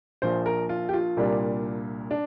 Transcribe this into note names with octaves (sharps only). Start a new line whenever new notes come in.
A#1 A#2 F3 C5
A#4
F4
G4
F4
C2 A#2 G3 A#3 D4
D4